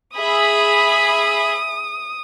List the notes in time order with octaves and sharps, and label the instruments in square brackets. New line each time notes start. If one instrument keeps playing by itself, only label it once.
[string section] G#4 E5 B5 [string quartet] D#6